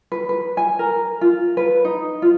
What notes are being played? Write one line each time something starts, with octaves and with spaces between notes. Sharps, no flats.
B4
B4
G#5
A#4
F4
B4
D#4
F4